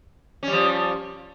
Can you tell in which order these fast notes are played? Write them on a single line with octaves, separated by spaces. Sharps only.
C#4 G3 F3